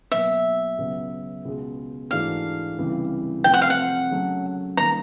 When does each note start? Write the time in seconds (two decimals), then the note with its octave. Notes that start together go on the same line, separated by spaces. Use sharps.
0.12 B2 F#3 A#3 E5
0.78 C#2 B2 F#3 B3
1.45 C#2 B2 G#3
2.11 G#2 E3 A3 D4 F#4 F5
2.78 C#2 C3 E3 G3
3.44 C3 F3 A3 C4 G5
3.54 F#5
3.62 F5
3.70 F#5
4.11 C#3 F#3 A3 C#4
4.77 D#3 G3 A#3 C#4 A#5